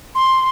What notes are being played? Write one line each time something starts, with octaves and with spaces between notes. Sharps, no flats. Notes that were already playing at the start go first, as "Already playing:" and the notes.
C6